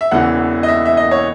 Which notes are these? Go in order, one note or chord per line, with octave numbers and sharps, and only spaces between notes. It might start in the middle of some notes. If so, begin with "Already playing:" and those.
E5
E1 E2 C#3 E3 F#5
D#5
E5
E5
D#5
C#5